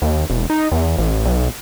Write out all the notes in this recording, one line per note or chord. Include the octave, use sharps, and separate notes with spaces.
D#2
E1
D#4
E2
A1
B1